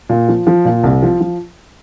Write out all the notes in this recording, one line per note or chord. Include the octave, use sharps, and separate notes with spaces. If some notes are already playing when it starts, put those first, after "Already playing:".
A#2
F3
F3
A#2
C2
F3
F3